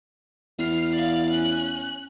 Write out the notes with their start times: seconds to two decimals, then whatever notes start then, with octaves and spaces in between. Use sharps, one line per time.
0.59 E2 F6 C7
0.93 D5 F5
1.30 C#4 F#6